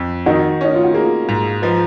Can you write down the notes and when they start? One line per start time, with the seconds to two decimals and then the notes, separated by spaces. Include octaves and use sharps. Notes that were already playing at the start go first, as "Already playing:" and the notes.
Already playing: F2
0.26 D#3 D#4 F#4
0.61 C#4 D#4
0.75 F4
0.84 F#4
0.94 A#3 F4 G#4
1.29 G#2
1.62 F3 B4 D#5